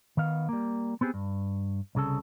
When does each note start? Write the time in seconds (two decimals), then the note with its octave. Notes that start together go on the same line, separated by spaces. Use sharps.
0.17 D#3 B3 F5
0.49 G3 A#3
1.01 B3 C4 G4 G#4
1.14 G2
1.95 C2 C#3 A4